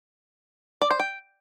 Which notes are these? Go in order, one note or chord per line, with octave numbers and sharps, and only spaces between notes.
D5
C5
G5